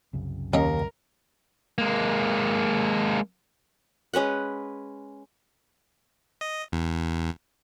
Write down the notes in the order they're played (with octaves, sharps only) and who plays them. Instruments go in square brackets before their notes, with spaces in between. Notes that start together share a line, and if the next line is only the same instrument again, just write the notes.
[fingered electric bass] C2 F#2 C#3
[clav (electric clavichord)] D#2 [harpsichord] C#4 C#5 D#5 [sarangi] A#4
[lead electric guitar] G#3 A#3
[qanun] G#3 C#4 B4 F#5
[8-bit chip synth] D#5
E2